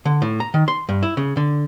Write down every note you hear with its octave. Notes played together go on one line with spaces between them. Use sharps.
D3
A2
A#5
D#3
C6
G2
E4
C#3
D3